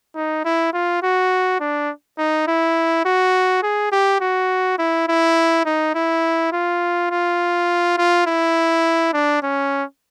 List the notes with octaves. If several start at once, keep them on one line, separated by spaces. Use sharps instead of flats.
D#4
E4
F4
F#4
D4
D#4
E4
F#4
G#4
G4
F#4
E4
E4
D#4
E4
F4
F4
F4
E4
D4
C#4